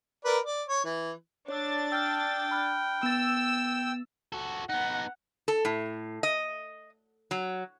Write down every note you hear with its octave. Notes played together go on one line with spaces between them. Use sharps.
A#4 B4 D5
D5
C#5
E3
D4 C#5 E6 A6
G5 E6 F6
B5 F6 F#6
B3 E6 A6
F#4 A4
B3 D#4 F#5
A4
A2
D#5
F#3